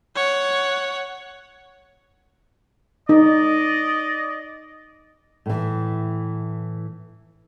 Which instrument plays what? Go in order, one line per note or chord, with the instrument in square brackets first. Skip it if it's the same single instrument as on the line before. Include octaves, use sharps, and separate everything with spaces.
[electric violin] C#5 F#5
[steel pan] D#4 [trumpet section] D5 D#5
[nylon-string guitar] A2 E3